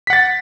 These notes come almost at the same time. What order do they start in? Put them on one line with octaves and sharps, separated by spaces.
B6 F#5 A6